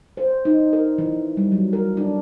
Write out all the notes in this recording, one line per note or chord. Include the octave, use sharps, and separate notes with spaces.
C5
D#4
A#4
E3
G3
F#3
A#4
D4